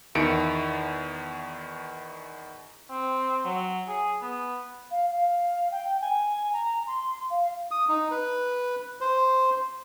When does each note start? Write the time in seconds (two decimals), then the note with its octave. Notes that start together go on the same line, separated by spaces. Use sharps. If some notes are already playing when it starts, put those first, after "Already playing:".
0.15 E2 D#3 E4 E5 C#7 D7
2.91 C4
3.44 F#3
3.88 G#4
4.22 B3
4.91 F5
5.12 F5
5.72 G5
6.01 G#5
6.53 A#5
6.87 C6
7.31 F5
7.71 D#6
7.89 D#4
8.11 B4
9.01 C5